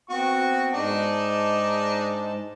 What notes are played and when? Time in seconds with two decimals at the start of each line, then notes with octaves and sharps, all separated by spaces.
0.10 B3 C4 F#4 C#6
0.73 G#2 G#3 D4 D#4 A5